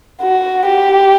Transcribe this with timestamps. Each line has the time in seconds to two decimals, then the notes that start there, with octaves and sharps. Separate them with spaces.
0.22 F#4
0.66 G4